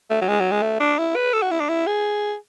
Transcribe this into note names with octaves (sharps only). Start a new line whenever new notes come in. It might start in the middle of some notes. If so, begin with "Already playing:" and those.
A3
F#3
G#3
F#3
G#3
A3
D4
E4
B4
A4
F#4
E4
D4
E4
G#4